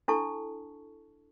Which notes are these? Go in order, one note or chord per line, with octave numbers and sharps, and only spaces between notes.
D4 E4 A4 A5 C#6